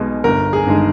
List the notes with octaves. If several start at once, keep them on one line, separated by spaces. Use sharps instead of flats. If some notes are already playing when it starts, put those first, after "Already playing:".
Already playing: B1 B2 G#3
G1 A#4
G#4
G2 D#3 G#3